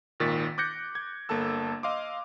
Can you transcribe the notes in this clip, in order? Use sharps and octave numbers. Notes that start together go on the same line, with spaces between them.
G#1 A#2 D#3 C#6 A6 B6
D6 F#6 G6 A#6 C#7
G#6
G1 A#3 A4 A5 E6
D#5 F5 C6 D6